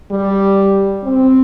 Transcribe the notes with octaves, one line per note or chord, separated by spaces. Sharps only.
G3
C4